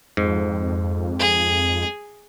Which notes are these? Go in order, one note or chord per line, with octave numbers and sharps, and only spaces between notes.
F2 G#2
G#4